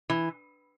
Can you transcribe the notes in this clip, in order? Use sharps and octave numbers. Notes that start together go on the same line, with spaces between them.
E3